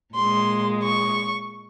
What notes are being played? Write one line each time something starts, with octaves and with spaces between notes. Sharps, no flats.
A#2 G#3 C6
C#6